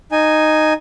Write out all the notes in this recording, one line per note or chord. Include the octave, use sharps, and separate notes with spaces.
D#4 G#5